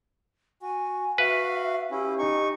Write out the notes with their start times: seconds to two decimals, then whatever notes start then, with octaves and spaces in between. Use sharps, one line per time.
0.62 F#4 G#5
1.18 F#4 B4 E5 F5
1.91 C#4 E4 G4
2.19 D#4 C#6